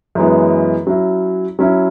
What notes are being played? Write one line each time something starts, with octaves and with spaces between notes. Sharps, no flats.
F#2 E3 G#3 B3
F#3 C#4 E4
F#3 C#4 E4